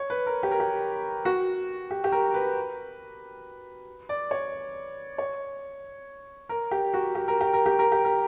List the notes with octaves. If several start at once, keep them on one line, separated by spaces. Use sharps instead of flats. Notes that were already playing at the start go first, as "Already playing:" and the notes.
Already playing: C#5
B4
A#4
G4
A#4
G4
F#4
G4
G4
A#4
B4
D5
C#5
C#5
A#4
G4
F#4
G4
A#4
G4
A#4
G4
A#4
G4
A#4